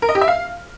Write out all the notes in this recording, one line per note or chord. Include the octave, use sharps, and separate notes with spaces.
A#4
D#5
G4
E5
F5